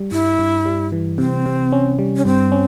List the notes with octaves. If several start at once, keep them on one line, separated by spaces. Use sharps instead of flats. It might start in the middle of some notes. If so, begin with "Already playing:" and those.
Already playing: G3
G2 E4
G2
G3
E3
C3 C4
C3
C#4
G3
C#4
G2 C4
C#4